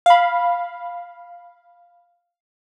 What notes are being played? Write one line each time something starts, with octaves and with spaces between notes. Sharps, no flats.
F5 B5